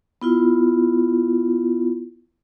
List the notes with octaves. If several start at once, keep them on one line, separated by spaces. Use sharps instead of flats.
B3 E4 F4